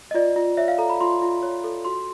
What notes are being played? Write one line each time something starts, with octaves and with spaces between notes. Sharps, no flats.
D#5
F4 D5
F4
C#5 E5
F5
A4 A#5
B5
F4 C6
F4
C#5
A4
F#4 C6